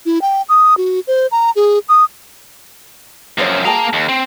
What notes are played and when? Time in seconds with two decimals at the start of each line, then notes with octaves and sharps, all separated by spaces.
0.06 E4
0.22 G5
0.49 D#6
0.77 F#4
1.07 C5
1.31 A#5
1.56 G#4
1.89 D#6
3.38 F#2 F3 G#4 C5 C#5
3.65 A#3 G#4 G5 A5 A#5
3.93 D#2
4.09 C4